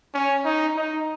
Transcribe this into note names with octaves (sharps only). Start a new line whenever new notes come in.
C#4
D#4
D#4